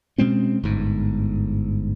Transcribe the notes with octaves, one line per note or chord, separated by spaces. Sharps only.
B2 G#3 C4 C#4
G1 G#2